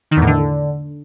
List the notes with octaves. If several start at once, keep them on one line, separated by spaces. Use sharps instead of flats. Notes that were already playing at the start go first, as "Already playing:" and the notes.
D#3
E2
A2
D3